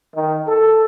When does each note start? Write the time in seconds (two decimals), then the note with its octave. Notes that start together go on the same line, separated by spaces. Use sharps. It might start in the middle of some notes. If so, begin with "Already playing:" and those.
0.14 D#3
0.48 A4